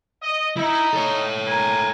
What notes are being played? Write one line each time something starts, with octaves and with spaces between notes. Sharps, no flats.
D#5
D#4 E4
A4 C#5
A#4 G#5